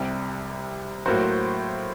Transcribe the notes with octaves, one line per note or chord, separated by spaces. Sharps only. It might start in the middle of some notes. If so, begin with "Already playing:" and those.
Already playing: C2 C3 G3
A2 F#3 A#3 F#4 C5